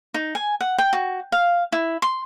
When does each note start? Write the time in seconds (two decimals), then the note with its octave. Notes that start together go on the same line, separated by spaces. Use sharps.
0.14 D#4
0.35 G#5
0.61 F#5
0.78 G5
0.93 F#4
1.32 F5
1.72 E4
2.02 C6